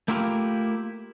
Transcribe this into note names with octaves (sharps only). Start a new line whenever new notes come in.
A3 A#3 E4 F4 G4 A#4